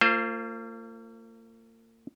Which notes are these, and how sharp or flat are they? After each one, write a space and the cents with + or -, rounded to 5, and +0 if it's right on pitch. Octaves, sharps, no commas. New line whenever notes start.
A#3 -45 F4 -15 C5 +0